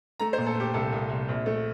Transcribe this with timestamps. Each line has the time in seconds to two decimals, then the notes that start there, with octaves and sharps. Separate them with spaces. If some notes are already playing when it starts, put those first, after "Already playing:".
0.20 A3 A#5
0.33 C5
0.38 A#2
0.47 A4
0.55 A3 G4
0.74 C2 A4
0.93 C2
1.10 C2
1.29 A#1
1.46 A3